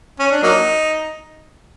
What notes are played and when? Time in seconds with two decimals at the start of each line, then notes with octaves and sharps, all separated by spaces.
0.19 C#4
0.31 D4
0.43 F#3 A#3 D#4